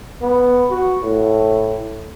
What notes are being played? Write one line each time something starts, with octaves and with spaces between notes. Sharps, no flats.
B3
F#4
A2